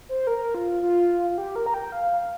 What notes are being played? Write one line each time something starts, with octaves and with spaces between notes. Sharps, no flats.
C5
A#4
F4
F4
F4
G4
A#4
A#5
G5
F5
F5